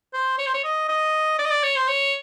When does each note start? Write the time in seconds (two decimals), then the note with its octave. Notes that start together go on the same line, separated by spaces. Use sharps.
0.13 C5
0.38 C#5
0.46 C5
0.54 C#5
0.64 D#5
0.89 D#5
1.39 D5
1.45 D#5
1.51 D5
1.64 C#5
1.76 C5
1.88 C#5